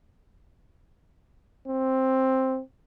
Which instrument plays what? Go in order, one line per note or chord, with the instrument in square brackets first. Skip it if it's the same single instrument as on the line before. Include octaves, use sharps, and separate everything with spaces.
[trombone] C4